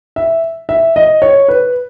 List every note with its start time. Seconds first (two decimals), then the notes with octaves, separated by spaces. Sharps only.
0.16 E5
0.69 E5
0.96 D#5
1.22 C#5
1.48 B4